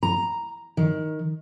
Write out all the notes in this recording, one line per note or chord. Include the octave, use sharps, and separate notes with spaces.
A#5
D#3